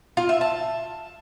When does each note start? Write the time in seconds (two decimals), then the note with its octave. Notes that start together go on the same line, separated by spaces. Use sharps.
0.17 F4
0.29 E5
0.41 A5